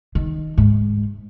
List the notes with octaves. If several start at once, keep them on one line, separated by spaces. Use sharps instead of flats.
D#3
G#2